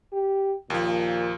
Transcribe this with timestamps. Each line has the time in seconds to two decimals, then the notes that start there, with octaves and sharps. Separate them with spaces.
0.13 G4
0.70 D#2 A#2 F3